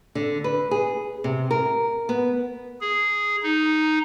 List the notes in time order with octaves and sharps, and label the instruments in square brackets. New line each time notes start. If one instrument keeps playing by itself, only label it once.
[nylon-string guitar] D3
B4
G#4
C3
A#4
B3
[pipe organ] G#4
D#4